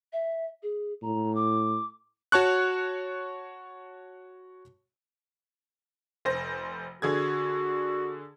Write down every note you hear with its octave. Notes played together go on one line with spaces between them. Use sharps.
E5
G#4
A2 A#5
D6
F#4 C#5 A5 C#6 F#6
F1 C5 A#6
D3 F#4 G#4 G#6